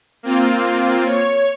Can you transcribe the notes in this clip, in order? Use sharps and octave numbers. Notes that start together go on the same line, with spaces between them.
A#3 C4 F4
C#5